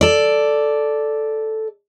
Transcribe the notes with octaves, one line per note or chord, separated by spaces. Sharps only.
A4 D5